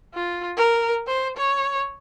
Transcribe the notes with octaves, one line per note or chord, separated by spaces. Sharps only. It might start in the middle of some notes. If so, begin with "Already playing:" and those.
F4
A#4
C5
C#5